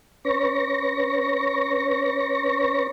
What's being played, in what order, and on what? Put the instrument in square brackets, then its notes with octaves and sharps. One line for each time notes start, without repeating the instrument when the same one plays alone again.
[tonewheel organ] C#4 B4 C#5 C#6 A#6